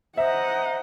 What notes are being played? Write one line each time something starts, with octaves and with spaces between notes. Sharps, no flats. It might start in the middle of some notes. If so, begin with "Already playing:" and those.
C5 D#5 E5 F#5 A#5